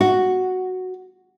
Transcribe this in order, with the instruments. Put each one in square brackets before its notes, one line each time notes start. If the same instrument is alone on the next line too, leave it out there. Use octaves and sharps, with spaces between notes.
[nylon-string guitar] F#4